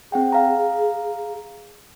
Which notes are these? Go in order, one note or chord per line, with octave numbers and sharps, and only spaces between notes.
C4 G#4 F#5 G5
F5 A#5